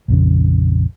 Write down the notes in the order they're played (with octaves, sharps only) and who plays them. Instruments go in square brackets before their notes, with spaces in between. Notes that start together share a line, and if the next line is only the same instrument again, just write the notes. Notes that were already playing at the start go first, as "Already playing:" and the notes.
[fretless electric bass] A#1 F2 C#3